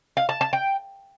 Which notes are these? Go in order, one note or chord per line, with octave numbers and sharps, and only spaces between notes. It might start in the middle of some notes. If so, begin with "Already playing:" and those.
F5
A5
A5
G5